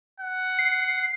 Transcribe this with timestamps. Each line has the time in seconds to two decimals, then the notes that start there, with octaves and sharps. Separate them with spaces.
0.20 F#5
0.59 C7